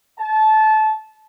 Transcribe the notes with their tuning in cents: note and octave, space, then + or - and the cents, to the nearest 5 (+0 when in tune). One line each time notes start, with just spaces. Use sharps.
A5 -20